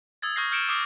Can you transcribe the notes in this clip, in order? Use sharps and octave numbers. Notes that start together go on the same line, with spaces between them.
D#6 E6 G#6 A6
C#6 D#6 F6 G6 A#6 C7
F6 G6 C#7 D7 E7
D6 D#6 F6 C7